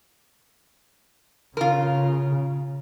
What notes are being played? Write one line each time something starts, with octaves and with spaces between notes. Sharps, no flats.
C#3 F4 A#4